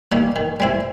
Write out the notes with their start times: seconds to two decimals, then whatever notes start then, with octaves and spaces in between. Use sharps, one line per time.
0.12 D#3 G3 A#3
0.36 D#3
0.60 G3 C4 E4